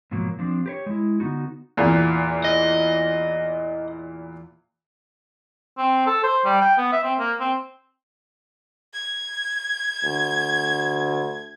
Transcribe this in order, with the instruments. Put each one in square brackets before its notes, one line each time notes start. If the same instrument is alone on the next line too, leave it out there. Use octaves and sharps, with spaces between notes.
[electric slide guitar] G#2 B2 F3 F#3 A#3
F3 C4 D4
G4 B4 C#5
G#3 E4
D3 B3 D#4 F#4
[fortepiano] E2 A#2
[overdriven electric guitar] D#5
[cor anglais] C4
A4
C5
G3
G5
B3
E5
C4
A#3
C4
[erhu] G#6
[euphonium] D2